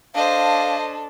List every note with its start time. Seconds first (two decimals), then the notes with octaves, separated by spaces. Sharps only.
0.15 D4 A4 C5 D#5 F5